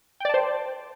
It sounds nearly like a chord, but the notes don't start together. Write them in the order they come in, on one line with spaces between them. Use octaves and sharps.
G5 D5 A5 C5